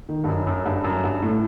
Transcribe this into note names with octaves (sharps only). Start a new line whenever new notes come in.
D#3
G2
F#2
F#2
G2
F#2
G2
A2